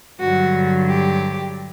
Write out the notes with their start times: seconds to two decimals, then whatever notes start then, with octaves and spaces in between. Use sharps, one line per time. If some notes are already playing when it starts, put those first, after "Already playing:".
0.20 G2 D3 F#3 F#4
0.89 G4